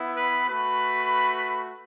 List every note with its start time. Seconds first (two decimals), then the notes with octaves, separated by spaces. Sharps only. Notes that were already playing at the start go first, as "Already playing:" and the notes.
Already playing: B3 E4
0.16 B4 B5
0.48 A3 F#4 B4 B5